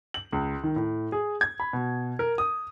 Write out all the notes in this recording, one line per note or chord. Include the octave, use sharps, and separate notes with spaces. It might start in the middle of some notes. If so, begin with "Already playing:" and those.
F#7
C#2
D#3
A2
G#4
G#6
B5
B2
A#4
D#6